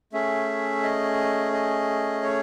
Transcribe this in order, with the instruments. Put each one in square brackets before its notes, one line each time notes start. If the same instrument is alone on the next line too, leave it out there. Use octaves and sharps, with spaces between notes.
[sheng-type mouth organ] A3 C#4 G#4 E5
D#5
D#5
C#5